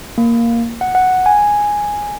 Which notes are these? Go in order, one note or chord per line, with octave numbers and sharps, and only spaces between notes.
A#3
F#5
F#5
G#5